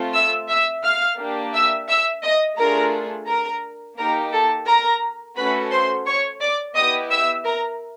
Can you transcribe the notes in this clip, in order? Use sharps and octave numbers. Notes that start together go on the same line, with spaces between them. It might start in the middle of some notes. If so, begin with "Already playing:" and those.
Already playing: A3 C4 F4
E5 E6
E5 E6
F5 F6
A#3 D4 G4
E5 E6
E5 E6
D#5 D#6
A3 D4 F4 G#4 A#4 A#5
A#4 A#5
A#3 D#4 G4 A#4 A#5
A4 A5
A#4 A#5
A3 C#4 F#4 A4 B4 B5
C5 C6
C#5 C#6
D5 D6
B3 E4 G4 D#5 D#6
E5 E6
A#4 A#5